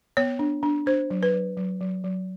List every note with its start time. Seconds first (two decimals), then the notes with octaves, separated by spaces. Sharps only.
0.17 B3 C#5
0.39 D4
0.63 D4
0.86 D4 C5
1.10 F#3
1.23 B4
1.34 F#3
1.57 F#3
1.81 F#3
2.04 F#3